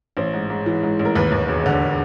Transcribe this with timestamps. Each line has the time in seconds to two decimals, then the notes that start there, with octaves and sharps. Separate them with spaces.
0.17 A1 C5
0.34 G#2
0.50 G#2
0.66 E3
0.83 G#2
0.99 A1
1.05 A#4
1.15 D#2 B4
1.32 D#2
1.49 E1
1.66 D3